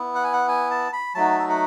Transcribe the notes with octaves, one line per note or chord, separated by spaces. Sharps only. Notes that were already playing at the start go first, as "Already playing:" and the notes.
Already playing: B3 E4
F#5
G#5
F#5
G#5
A5
B5
F#3 A3 D#4 F#4 A5
E5
F#5